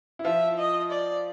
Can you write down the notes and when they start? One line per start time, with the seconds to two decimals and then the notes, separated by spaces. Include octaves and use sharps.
0.19 E4
0.25 F3 F4 E5
0.58 D#5
0.91 D5